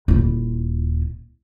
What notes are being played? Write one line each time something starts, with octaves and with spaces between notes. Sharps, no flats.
D#1 E4